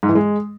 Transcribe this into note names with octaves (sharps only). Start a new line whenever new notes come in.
G#2
E3
G#3